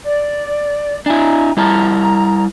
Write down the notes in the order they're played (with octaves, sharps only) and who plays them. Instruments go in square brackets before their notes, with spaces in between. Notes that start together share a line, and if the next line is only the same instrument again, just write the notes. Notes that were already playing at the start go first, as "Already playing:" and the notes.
[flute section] D5
[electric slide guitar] D4 E4 [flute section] G#5 A#5
[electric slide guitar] G3 E4 A5 [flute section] A#5